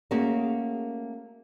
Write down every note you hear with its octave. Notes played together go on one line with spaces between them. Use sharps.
A3 A#3 C#4 F#4 G#4 A#4